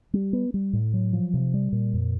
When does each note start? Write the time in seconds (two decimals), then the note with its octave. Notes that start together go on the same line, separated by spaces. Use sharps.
0.13 G3
0.33 B3
0.54 G3
0.73 A2
0.94 F#3
1.13 F3
1.34 C3
1.54 G3
1.72 A#2
1.93 F2